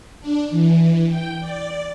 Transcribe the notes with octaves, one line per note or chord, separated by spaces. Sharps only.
D4
E3
G5
D5